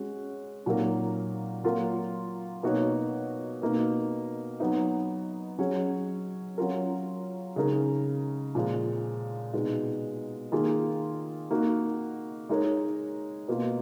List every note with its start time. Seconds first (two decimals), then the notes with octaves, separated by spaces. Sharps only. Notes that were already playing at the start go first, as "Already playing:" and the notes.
Already playing: G#3 C#4 F#4
0.66 A#2 F#3 A#3 D#4 A#4
1.64 F#3 A#3 F4 A#4
2.63 B2 A#3 D#4 F#4 C#5
3.62 B2 A#3 D#4
4.60 F#3 B3 D#4
5.58 F#3 C#4 G#4 C#5
6.58 F#3 C#4 F4 A#4
7.56 C#3 G#3 D#4 A#4
8.55 A#2 F3 G#3
9.53 B2 G#3 D#4
10.52 D#3 A#3 F4 G#4
11.51 A#3 D#4 F#4
12.49 G#3 D#4 A#4 C#5
13.48 B2 A#3 F4